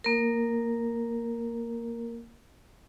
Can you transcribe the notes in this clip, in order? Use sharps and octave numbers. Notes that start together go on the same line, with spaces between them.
A#3 A#4